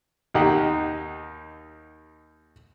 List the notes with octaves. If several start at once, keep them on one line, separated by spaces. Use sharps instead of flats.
D#2 D#4 G4 F#5